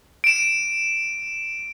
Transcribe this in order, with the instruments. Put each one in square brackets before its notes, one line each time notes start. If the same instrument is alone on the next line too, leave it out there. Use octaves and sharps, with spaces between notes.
[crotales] D7 E7